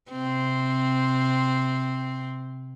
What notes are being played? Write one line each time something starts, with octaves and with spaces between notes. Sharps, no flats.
C3 C4